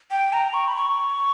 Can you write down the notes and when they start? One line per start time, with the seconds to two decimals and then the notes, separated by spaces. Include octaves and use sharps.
0.11 G5
0.33 A#5
0.54 C#6
0.68 B5
0.76 C#6